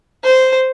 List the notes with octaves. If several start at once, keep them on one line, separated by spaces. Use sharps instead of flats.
C5